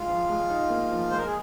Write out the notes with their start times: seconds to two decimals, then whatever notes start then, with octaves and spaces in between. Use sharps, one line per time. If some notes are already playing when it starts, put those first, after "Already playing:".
Already playing: G#3 F4
0.08 F3
0.29 G#3
0.49 D#4
0.70 A#3
0.90 F3
1.10 G#3 C5
1.18 A#4
1.26 G#4